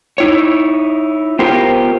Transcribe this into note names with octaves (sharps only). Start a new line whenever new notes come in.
D#4 E4 C#5
B3 F4 G4 A#4 C5